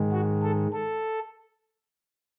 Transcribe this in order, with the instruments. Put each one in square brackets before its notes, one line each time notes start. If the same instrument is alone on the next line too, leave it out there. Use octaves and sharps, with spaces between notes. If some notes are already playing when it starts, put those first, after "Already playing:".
Already playing: [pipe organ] G#2 D#3 G#3
F#4
A4
A4